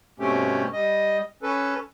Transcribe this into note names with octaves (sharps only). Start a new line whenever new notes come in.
G2 B2 A3 C4 C#4 G4
G3 D#5
C#4 A4 B4